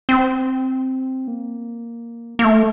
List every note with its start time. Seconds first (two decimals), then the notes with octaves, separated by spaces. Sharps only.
0.09 C4
1.28 A#3
2.39 A#3
2.44 A3